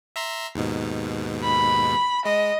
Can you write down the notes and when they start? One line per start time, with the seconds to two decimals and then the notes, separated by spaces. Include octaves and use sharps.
0.16 E5 A#5 C6
0.55 D#2 G#2 B2
1.44 B5
2.26 G#3 D#5